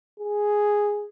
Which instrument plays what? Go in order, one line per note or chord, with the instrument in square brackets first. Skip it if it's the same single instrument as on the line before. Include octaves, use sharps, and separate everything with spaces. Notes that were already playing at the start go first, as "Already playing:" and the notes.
[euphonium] G#4